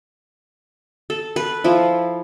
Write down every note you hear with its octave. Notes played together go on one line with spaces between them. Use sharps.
A4
B4
F3 E4